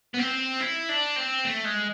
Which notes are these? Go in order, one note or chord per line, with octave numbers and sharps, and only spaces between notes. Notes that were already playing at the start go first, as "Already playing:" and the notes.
B3
C4
E4
D4
C4
A3
G#3